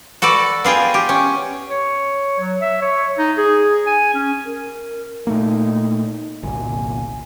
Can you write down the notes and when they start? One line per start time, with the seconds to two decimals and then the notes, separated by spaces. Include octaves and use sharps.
0.22 F#4 A4 B4 D5
0.64 B3 F4 G#4 G5
0.94 G4
1.09 C#4
1.68 C#5
2.40 F#3
2.62 E5
2.82 C#5
3.18 D#4
3.38 G#4
3.87 G#5
4.14 C#4
4.45 A#4
5.27 A#2 A3 A#3 D#4
6.43 G1 C2 A#2 G#5